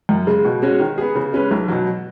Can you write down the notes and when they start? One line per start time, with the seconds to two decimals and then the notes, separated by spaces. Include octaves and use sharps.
0.09 F#2
0.27 C#3 G#3
0.45 B2
0.62 G#3 C#4 F#4 C#5
0.80 D#3
0.98 B3 G#4
1.15 C#3
1.33 G#3 C#4 B4
1.51 B1
1.68 B2 F#3